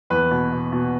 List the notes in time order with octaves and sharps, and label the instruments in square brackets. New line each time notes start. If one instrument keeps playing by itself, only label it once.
[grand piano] E2 B4
B2
B2
B2